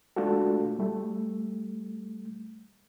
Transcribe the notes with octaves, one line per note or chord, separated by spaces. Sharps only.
G#3 A3 D4 F4 F#4 A4
G3 A3